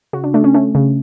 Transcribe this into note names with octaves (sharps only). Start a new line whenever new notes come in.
C#3 F#4
D4
A3 D4
C#4
A3 C#4
C#3